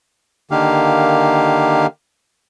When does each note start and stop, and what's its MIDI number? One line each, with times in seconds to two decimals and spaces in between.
0.51 1.86 50
0.51 1.86 51
0.51 1.86 58
0.51 1.86 67
0.51 1.86 77